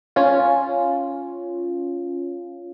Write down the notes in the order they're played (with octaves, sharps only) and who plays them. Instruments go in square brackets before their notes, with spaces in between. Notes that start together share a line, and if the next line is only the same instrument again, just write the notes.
[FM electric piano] C#4 F4